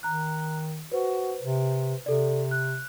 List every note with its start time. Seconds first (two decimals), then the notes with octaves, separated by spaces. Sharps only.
0.03 D#3 A#5 F#6
0.92 F#4 B4 C5
1.42 C3
2.06 C3 A4 D5
2.51 F#6